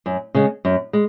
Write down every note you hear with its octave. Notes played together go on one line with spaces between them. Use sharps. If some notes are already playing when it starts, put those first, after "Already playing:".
F#2
C#3 G#3
F#2
G#3